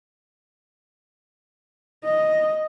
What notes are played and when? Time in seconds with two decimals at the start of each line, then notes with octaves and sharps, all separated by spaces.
2.04 D#5